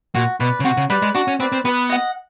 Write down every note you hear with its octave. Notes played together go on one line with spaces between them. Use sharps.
A#2 F#4
B2 B4 D5
C#3
C3 F#4
C#3
G3 B4 D5
G#3
D4 F#4
C#4
C4 B4 D5
C4
B3 B4
D#5 F#5